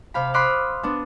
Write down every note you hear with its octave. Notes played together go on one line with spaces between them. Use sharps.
C3 F5 B5
B5 C6 D6 D#6 F6 F#6
B3 D4